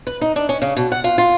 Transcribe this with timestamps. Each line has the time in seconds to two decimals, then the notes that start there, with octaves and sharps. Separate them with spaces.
0.07 B4
0.21 D#4
0.36 D4
0.49 C#4
0.62 C#3
0.77 B2
0.92 F#5
1.04 F4
1.18 F4